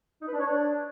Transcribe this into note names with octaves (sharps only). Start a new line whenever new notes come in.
D#4
B4
D4
C#5
D4